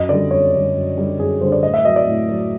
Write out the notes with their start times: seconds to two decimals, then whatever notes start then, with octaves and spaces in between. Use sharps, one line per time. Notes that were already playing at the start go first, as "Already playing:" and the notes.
Already playing: F#2 D#5
0.09 D3 G3 D5
0.31 F#2 C#5
0.53 D3 G3
0.75 F#2
0.98 D3 G3
1.19 F#2 G#4
1.41 D3 G3 C5
1.52 D5
1.63 A2 D#5
1.74 E5
1.85 F#3 D#5
1.96 D5
2.07 A2
2.29 F#3